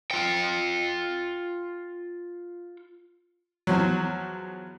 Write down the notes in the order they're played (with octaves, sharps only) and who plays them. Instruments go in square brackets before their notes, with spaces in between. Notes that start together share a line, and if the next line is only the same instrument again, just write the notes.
[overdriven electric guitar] F4 G5
[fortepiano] E2 F3 F#3